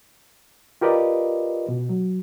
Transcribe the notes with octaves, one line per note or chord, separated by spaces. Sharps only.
F4 G4 A#4 B4 D5 D#5
B2
F#3